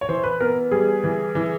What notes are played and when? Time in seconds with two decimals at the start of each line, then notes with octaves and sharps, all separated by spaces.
0.01 C#5
0.09 E3 C5
0.24 B4
0.40 B3 A#4
0.71 G3 G#4
1.04 E3
1.35 E3